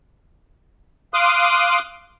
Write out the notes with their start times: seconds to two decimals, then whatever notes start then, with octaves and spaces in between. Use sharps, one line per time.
1.14 F5 C6 D6 D#6 F#6